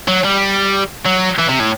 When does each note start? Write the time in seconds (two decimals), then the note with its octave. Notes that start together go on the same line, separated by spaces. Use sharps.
0.08 F#3
0.24 G3
1.05 F#3
1.38 E3
1.49 C3
1.60 A2